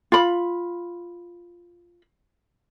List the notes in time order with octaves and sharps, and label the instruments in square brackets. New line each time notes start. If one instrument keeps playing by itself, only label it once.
[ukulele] F4 B5